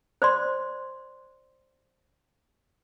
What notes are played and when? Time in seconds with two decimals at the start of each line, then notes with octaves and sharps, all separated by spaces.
0.22 C5 D5 C6